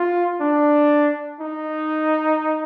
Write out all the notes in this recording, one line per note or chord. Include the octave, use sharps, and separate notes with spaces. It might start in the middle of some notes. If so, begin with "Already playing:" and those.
Already playing: F4
D4
D#4